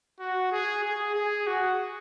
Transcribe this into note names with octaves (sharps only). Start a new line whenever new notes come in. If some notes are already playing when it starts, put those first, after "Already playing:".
F#4
G#4
G#4
G#4
F#4